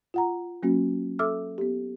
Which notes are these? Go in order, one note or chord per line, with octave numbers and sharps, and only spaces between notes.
F4 F#5 A#5
F#3 A#3 C#4 F#4
A4 E5 D6 E6 F6
B3 G4